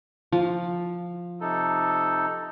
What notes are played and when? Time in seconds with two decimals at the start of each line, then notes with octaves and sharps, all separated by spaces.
0.32 F3
1.41 C3 D#4 A4